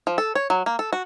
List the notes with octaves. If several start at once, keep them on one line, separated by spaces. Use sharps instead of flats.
F3
A4
C#5
F#3
A#3
A4
F#4